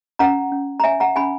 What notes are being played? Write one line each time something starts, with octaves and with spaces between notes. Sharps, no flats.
C#4 F#5 A#5
C#4
A#5
C#5 E5 G#5
F#5 A#5
C#4 G#5 B5